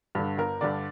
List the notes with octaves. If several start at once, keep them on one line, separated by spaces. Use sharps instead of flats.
G2 D3
G1 A#4
G2 D3 D5